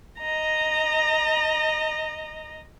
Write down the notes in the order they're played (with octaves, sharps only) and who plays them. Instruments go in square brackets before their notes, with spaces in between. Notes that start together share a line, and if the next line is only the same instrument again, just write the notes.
[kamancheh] D#5 A#5